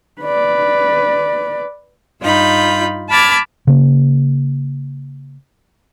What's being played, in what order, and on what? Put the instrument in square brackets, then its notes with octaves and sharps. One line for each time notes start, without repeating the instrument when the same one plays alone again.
[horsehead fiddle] B4 D5
[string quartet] G2 D#4 F4 B5 G6
A5 B5 D6 F6 G#6 A6
[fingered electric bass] C#3 A#3